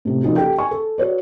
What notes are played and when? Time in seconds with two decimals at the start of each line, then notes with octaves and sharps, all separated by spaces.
0.05 A2 C3
0.23 A#2 C#3 F3 C#4 D#4 F#4
0.36 G4 A4 G5
0.58 G#5 C#6
0.71 A4
0.98 F#4 B4 C#5 D5